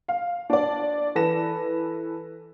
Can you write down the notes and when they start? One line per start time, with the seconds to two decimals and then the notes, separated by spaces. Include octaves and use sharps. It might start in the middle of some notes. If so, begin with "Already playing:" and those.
0.08 F5
0.50 D4 D5
1.15 E3 A4 B4 A#6 E7